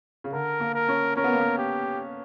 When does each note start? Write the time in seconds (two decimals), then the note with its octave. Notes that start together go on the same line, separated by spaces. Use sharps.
0.24 C#3
0.32 D3 A#4
0.60 A#3
0.74 A#4
0.89 C#4
1.16 C#4 A#4
1.24 B3
1.32 A#3
1.40 B3
1.58 G4